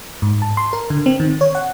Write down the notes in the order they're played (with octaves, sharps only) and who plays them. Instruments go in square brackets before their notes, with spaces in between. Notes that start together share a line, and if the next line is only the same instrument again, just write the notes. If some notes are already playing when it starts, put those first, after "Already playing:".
[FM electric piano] G#2
A5
C6
A#4
D3
C4
D#3
C#5
F#5